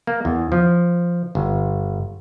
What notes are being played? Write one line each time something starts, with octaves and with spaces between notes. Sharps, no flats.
A#3
E2
F3
G1